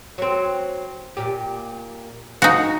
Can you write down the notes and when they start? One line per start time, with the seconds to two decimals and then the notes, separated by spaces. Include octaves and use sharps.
0.18 F#3 C4
1.17 A#2 G4
2.42 D#4 F#4 F5